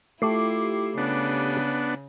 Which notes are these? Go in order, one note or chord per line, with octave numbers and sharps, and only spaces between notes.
A3 E4 F4 G4 D6 C7
C#3 B3 D4